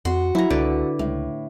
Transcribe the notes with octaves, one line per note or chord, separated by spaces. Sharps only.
F2 F#4 C6
F#3 E4 A#5
C#2 D3 B4 D5
C#2 A2